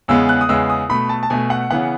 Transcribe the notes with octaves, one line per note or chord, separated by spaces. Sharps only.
E2 C#3 G#3 B3 E6
F#6
D#6
E2 C#3 G#3 B3 E6
D#6
B2 A3 B5
A5
A5
B2 A3 G#5
F#5
C#3 E3 B3 F#5